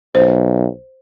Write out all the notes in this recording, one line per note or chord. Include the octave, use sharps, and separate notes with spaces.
B1 C5